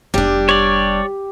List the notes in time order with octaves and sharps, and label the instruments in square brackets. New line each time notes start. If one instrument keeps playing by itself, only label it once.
[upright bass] F1 B3 [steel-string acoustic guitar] G3 D4 [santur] G4
[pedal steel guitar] C#5 D5